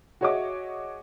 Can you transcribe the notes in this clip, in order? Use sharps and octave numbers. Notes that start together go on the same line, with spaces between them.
F#4 G#4 C#5 D#5 E5 D6